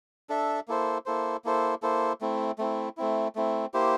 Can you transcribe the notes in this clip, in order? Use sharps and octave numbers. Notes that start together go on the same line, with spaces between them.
D4 A4 E5
A#3 E4 A4 C5
A#3 E4 A4 C5
A#3 E4 A4 C5
A#3 E4 A4 C5
A3 C4 E4
A3 C4 E4
A3 C4 E4
A3 C4 E4
A#3 E4 G4 C5